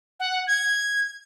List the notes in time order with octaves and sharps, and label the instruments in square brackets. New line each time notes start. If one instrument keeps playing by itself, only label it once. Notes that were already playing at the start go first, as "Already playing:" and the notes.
[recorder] F#5
G#6